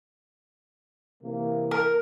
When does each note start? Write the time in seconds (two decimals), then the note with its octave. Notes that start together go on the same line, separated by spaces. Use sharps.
1.23 C3 E3 A#3
1.71 A#4